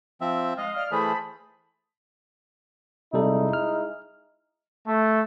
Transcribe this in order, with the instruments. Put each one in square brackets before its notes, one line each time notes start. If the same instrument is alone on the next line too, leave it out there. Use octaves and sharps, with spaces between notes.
[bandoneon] F3 C4 E5
[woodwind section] G#3 F5 [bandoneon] D#5
[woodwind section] D5 F5 F6
[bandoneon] E3 A3 G#4 [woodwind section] C5 A5 B5
[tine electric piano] C3 G3 A4 [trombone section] G#3 D#4 E4
[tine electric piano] F6
[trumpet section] A3